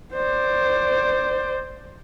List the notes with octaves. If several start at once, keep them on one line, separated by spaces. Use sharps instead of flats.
C5 D5